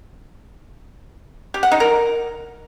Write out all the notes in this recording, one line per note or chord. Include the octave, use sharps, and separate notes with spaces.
G4
F#5
D#4
A#4